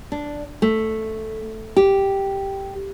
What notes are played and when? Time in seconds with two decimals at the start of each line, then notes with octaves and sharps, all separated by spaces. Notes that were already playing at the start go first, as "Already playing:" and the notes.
0.12 D4
0.62 A3
1.77 G4